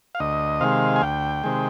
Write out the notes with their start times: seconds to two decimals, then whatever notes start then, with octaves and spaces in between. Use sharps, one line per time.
0.15 F5
0.20 D2 D#5
0.61 C3 D#3 G#3 F5
0.96 G#5
1.02 D2 G5
1.44 C3 D#3 G#3